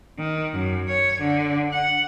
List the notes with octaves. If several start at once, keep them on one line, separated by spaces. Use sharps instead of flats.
D#3
F#2
C#5
D3
F#5